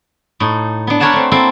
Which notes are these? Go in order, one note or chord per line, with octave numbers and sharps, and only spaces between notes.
A2 D#4
B3 D4
A#4 B4 C#5 D5 F#5 A5
A3 C4
A#3 C4 E4 A4